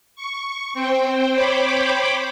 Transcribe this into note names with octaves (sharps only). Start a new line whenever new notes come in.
C#6
C4 C5 G5
C5 C#5 G5 B5 D6